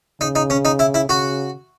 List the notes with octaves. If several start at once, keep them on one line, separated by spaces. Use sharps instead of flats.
C#3 D#4
D#4
C#4
D#4
E4
E4
C#3 F#4